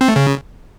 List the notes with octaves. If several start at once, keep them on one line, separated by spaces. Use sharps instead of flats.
C4
A3
C#3